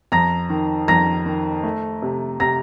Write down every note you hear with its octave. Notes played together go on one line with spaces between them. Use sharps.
F2 A#5 A#6
D#3
F2 A#5 A#6
D#3
A3
C3
C3 A#5 A#6